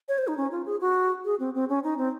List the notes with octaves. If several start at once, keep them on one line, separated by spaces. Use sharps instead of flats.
C#5
C5
D#4
C#4
F4
G#4
F#4
G#4
C4
C4
C#4
D#4
C4